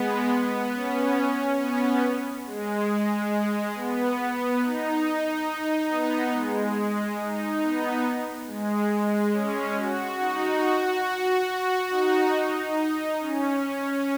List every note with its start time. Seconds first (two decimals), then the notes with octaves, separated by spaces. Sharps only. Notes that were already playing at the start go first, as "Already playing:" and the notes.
Already playing: G#3 B3
0.31 B3
0.74 C#4
1.60 B3
2.46 G#3
2.88 G#3
3.75 B3
4.17 B3
4.60 D#4
5.46 D#4
5.89 B3
6.32 G#3
6.75 G#3
7.18 D#4
7.60 B3
8.47 G#3
9.32 C#4
9.75 F#4
10.18 D#4
10.61 F#4
11.04 F#4
11.90 D#4
13.19 C#4